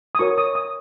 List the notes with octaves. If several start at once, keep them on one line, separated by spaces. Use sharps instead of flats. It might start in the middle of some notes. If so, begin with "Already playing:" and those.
D#6
F#4 A#4 C#5 C#6
D#6
D#6